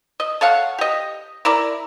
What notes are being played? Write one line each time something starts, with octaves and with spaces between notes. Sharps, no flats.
D#5
A4 C#5 F5 F#5
G4 D#5
E4 A#4 D5